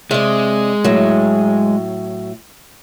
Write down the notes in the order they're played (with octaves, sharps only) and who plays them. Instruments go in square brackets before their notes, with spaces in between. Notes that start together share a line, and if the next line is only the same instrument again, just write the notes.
[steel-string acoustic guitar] C3 D5 [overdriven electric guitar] G#3
[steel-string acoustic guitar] A2 F#3